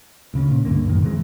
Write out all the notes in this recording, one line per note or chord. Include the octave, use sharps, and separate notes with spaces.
D2 C#3 B3 C#4
A#2
C#2 G2 D3 A#3
F#2 A2 D#3
C3 E3 G#3